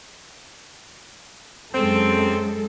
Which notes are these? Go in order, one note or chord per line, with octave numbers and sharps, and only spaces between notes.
F#2 G#3 C4 A4